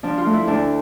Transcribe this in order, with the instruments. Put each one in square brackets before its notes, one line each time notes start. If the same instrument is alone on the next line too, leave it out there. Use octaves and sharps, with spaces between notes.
[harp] F3 D4
F4
A3
E4
D2 D4